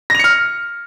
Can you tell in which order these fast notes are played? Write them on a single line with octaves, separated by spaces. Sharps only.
A#6 F7 C#7 F6